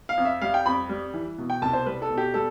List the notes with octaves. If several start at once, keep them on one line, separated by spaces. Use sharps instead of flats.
F5
F2
E5
G3 F5
G5
F2 B5
G3
E3
B2
G5
C2 A5
C5
G3 B4
A4
B2
G4
G3 A4